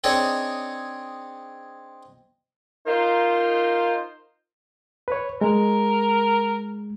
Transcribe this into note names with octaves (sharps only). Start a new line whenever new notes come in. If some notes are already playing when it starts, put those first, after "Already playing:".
C4 D4 D#4 G#4 C#5
D#4 F4 A#4 C5
B4 C#5
G#3 A#4